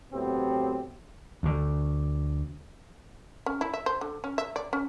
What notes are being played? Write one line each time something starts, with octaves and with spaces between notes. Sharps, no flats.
E2 A2 F#3 B3 C4 G4
D2 D3
C#4
E4
E5
C5
D3
C#4
E5
D5
C#4